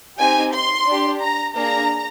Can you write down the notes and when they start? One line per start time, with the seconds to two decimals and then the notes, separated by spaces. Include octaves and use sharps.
0.18 C4 D#4 G4 G#5
0.53 C6
0.87 D4 G4
1.22 A#5
1.56 A#3 D4 G#4 A#5